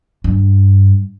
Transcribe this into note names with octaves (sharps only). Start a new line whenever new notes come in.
G2